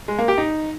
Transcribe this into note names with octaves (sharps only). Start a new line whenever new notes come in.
G#3
A#3
G4
D#4